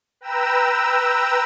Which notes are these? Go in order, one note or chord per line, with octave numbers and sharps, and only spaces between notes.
B4 G5 A#5 E6 E7